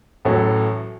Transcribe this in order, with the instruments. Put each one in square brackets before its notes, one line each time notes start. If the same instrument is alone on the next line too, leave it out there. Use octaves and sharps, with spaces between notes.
[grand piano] A1 A2 F#3